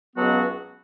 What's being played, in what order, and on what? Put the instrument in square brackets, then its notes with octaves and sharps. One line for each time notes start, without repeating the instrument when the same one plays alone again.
[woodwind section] C#2 B2 F#3 B3 F#4